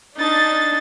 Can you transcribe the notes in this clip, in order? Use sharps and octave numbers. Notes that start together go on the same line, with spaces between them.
D4 D#4 A6